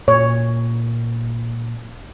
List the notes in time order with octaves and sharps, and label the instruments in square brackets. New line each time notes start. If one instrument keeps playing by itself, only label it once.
[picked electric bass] A#2 [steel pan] C#5